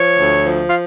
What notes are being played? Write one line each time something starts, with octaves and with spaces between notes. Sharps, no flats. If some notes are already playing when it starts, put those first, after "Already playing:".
Already playing: F3 C#5
D2
F3
F4